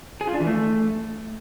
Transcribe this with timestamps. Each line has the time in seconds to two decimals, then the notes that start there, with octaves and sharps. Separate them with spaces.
0.21 G#4
0.27 F4
0.34 D4
0.40 E3
0.47 A3